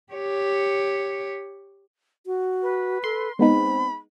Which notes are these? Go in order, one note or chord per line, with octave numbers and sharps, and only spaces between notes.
G4 C#5
F#4
B4
A4 C6
G#3 B3 C4 D#4 B5